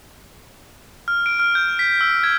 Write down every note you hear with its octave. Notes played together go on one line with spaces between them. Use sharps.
F6
D7
F6
G6
B6
E6
G#6